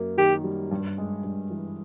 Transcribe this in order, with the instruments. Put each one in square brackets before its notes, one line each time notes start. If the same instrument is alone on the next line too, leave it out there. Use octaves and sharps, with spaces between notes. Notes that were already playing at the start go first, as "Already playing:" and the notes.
Already playing: [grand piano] F#2 A#3
[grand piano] D#3 [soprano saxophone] G4
[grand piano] G3
G2
G#3
G2
E3